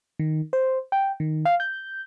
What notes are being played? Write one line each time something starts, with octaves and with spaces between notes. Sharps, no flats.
D#3
C5
G5
D#3
F5
G6